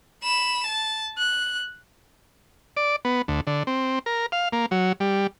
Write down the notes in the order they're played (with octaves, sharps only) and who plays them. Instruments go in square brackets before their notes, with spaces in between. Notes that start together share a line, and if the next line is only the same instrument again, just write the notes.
[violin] B5 E7
A5
F#6
[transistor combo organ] D5
B3
D2
D3
C4
A#4
F5
A#3
F#3
G3